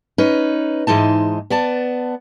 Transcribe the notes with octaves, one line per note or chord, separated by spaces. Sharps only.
C#4 D#4 B4
G#2 E3 G#3 D#4 A5
B3 D5 A5